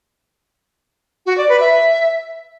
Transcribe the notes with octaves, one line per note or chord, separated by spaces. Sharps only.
F#4
D5
B4
E5